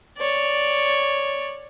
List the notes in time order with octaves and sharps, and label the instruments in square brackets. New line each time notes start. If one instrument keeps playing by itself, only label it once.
[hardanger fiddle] C#5 D5